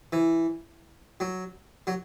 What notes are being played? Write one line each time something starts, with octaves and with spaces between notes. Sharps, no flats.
E3
F#3
F#3